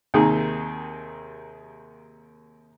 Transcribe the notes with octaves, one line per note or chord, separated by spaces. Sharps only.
D#2 C3 D#3 A#3 G#4